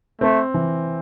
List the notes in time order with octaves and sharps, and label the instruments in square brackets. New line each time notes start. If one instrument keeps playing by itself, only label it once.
[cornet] A3 [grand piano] C4
[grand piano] E3